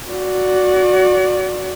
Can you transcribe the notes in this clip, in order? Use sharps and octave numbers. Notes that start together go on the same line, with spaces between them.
F#4 D5